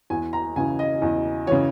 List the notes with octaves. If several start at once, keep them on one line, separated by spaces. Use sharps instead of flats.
E2 G#5
A#5
C#3 E3 G#5
D#5
E2
C#3 E3 C#5